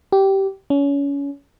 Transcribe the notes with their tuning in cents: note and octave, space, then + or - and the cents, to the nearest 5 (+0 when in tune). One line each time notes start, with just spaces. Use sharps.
G4 -15
C#4 +25